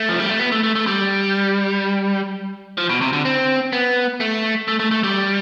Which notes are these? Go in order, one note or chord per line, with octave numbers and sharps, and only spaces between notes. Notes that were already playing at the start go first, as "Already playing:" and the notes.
Already playing: A3
F3
G3
A3
B3
A3
A3
A3
G3
F3
B2
C3
D3
C4
B3
A3
A3
A3
A3
G3